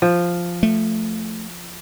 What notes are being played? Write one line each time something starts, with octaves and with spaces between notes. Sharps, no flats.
F3
A3